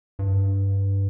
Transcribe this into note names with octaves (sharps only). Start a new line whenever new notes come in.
G2